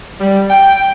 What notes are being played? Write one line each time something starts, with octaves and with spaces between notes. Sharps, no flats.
G3
G5